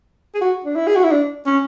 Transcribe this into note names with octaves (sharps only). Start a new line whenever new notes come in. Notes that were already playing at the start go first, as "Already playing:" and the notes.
G#4
F#4
D4
E4
G#4
F#4
E4
D4
C#4